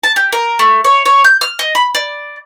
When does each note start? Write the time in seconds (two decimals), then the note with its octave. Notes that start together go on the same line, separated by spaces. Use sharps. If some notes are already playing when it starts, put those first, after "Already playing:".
0.04 A5
0.16 G4
0.32 A#4
0.59 A3
0.84 C#5
1.05 C#5
1.24 G6
1.41 F6
1.59 D#5
1.75 B5
1.95 D5